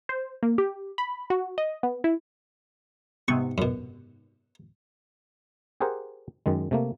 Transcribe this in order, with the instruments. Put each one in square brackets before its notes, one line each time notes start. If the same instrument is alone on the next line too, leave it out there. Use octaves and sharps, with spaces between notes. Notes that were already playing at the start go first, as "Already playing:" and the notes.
[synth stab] C5
A#3
G4
B5
F#4
D#5
B3
E4
[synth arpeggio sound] G#2 C3 B3 [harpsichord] C#6
[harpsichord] F#2 B2
[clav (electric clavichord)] G4 G#4 A#4 C5 F#5
F#2 D#3 G#3
C3 A3 A#3